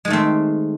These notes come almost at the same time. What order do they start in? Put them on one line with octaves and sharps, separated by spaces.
G#3 D#3 A3 C4